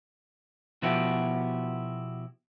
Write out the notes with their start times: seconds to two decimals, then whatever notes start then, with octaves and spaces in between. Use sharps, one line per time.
0.82 B2 F3 B3 E4 F#4 G4